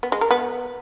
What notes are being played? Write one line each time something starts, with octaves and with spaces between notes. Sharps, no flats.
B3
G#3
A#4
B3